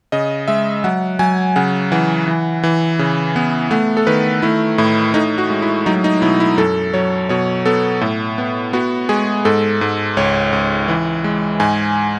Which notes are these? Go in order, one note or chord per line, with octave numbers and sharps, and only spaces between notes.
C#3 D#5
G#3 E5
F#3 F#5
F#3 G#5
C#3 F#5
E3 F#5
E3
E3
C#3
B3
A3 F#5
A4
D#3 B4
A3 E4
A2 E4
A2 D#4
F#4
G#3
E4
F#3 D#4
D#4
B2 E4
E4
F#2 A4
F#3 C#5
B2 C#5
B3 A4
A2
B3
B3 F#4
G#3 G#4
G#2 A4
G#2
C#2 C#5
C#2
E3
G#3
G#2 G#5